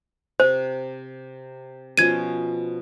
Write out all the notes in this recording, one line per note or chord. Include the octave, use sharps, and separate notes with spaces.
C3 C5
B2 F3 C#4 G#6 D#7